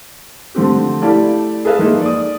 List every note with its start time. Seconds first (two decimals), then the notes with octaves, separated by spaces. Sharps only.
0.55 D3 F3 A3 C4 G4
1.02 A3 E4 G4 D5 F5 A5
1.65 G#4 A4 B4 E5 F5
1.79 F3 A#3 D#4 G#4
2.01 D5 D#6